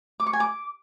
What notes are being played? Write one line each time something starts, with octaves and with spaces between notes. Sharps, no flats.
D6
C#6
G#5
D6